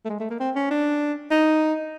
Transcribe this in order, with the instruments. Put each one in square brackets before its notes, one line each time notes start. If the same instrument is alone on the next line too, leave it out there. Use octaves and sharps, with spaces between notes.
[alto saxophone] A3
G#3
A3
A#3
C4
C#4
D4
D#4